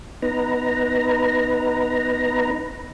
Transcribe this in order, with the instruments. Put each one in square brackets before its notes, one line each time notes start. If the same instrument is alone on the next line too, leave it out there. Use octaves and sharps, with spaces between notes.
[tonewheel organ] B3 D#4 B4 A#5